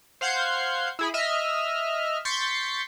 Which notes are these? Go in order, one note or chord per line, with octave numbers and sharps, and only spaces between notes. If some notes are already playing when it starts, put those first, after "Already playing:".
C5 F5 F#5 G6 G#6 C7
E4 G#4 B5
D#5 E5 F6
C6 C#6 G6 A6 B6 C#7